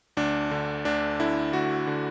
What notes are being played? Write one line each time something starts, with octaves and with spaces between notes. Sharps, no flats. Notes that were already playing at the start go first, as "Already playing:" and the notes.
D2 D4
D3
D2 D4
D3 E4
D2 F#4
D3